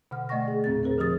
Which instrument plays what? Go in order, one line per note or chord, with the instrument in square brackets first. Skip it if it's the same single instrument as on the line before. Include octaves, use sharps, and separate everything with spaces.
[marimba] B2 D3 F#5 F6
A3 D5 D#5 F#5 C#6 A#6
G#4
E2 A#2 C4 G#4 A6
C4 G#4 A#4 C5
D3 F3 G4 G#4 D#6 A6